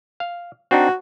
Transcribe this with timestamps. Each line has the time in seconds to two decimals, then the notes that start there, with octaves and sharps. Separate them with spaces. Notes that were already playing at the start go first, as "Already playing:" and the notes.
0.20 F5
0.71 C4 D4 D#4 F#4